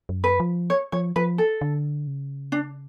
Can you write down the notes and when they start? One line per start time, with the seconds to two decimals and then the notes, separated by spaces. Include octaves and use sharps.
0.09 F#2
0.24 B4
0.40 F3
0.70 C#5
0.92 F3 C#5
1.16 F3 B4
1.38 A4
1.61 D3
2.07 C#3
2.52 D4